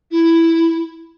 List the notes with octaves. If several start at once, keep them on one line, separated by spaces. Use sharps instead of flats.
E4